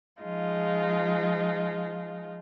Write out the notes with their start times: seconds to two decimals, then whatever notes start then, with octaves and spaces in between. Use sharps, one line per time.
0.22 F3 G#3 D#4 F4